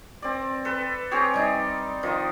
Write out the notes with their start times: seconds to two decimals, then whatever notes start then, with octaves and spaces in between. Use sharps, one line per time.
0.22 C4 D5
0.65 A4 B4
1.11 C4 G4 G#4 C#5
1.34 G3 D#4 D5
2.03 D#3 F3